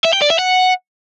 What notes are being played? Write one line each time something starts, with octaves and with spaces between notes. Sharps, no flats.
E5
G5
D5
E5
F#5